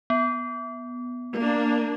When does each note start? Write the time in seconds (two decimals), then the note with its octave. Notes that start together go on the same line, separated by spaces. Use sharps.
0.10 B3
1.38 A#3 D4